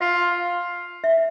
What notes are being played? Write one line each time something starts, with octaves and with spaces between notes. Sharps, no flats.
F4 F5
E5